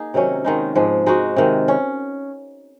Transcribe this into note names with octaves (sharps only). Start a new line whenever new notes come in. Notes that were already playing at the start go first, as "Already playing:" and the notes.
Already playing: A#3 D#4 G#4
C3 D#3 F#3 C#4
D#3 G#3 D#4
G#2 F3 G#3
G#3 D#4 F#4
C3 D#3 G#3
C#4